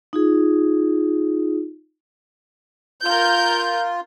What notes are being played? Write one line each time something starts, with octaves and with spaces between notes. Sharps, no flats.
D#4 F4 G#4
F4 A#4 G6